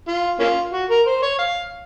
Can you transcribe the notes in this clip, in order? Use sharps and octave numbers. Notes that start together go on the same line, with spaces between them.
F4
A#3 C#4 F4
F#4
A#4
C5
C#5
F5